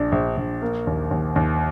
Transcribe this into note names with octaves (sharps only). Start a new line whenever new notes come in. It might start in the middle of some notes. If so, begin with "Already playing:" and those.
Already playing: A#1 D4
A#1
A#1
A#3
D#2
D#2
D#2